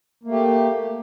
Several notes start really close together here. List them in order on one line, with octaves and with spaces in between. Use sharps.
A#3 A3 G4